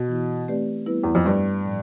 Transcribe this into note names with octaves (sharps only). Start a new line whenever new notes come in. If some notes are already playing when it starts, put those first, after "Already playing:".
Already playing: B2
E3 B3 E4
A3 C4 G4 B4 D5
G3 B3 E4 B4
E2
F2
G2 A3 D4 G4 B4
A2 F3